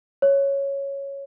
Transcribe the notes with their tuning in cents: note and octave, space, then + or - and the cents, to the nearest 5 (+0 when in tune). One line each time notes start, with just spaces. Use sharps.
C#5 +0